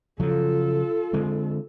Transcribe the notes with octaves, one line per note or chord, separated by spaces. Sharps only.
C#3 F3 F#3 F4 A4
D3 G#3 C4